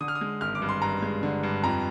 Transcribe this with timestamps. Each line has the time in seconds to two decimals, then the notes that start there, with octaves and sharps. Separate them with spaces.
0.01 D3 D#6
0.08 F6
0.15 D#6
0.21 G#3
0.41 G#1 F6
0.55 D6
0.62 G2
0.69 C6
0.82 G2 A#5
1.02 G#3
1.23 D3
1.43 G2
1.63 F2 A#5